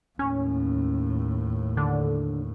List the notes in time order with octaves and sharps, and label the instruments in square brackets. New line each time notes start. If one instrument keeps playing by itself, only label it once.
[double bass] D#2 A2 [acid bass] C#4
[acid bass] D3